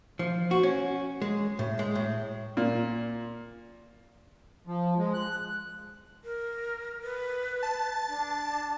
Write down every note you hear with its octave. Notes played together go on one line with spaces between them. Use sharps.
F3
F#4
C#4
G#3
A2
G#3
A2
A#2
F3
G#3
F#6
A#4
B4
A5
D4